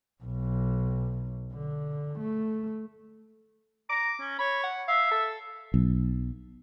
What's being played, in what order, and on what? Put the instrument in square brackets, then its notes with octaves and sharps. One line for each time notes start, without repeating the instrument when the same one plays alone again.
[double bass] B1
D3
A3
[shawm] A#5 [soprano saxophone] D6
[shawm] C#4
[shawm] C#5 [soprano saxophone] B5
[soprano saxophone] F#5
[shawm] E5 [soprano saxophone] F5
[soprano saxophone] A4
[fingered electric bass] B1